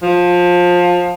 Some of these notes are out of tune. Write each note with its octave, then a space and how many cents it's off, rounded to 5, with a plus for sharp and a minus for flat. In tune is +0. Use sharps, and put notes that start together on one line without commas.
F3 +20